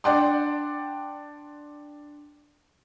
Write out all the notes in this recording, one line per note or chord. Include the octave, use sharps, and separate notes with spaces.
D4 D5 F#5 G5 A5 C6